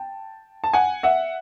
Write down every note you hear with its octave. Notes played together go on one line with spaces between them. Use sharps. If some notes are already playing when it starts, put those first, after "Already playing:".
Already playing: G5 A5
A5
F#5 G#5
E5 F#5